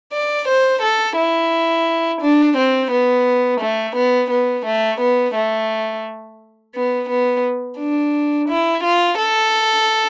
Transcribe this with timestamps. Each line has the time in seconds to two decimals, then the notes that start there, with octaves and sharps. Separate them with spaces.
0.13 D5
0.49 C5
0.82 A4
1.17 E4
2.21 D4
2.57 C4
2.92 B3
3.61 A3
3.96 B3
4.31 B3
4.66 A3
5.01 B3
5.35 A3
6.75 B3
7.09 B3
7.79 D4
8.49 E4
8.84 F4
9.18 A4